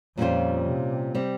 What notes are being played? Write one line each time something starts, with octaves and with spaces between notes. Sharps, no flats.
F2 A#2 G3 C#4 F4 C5
C3
G3 C4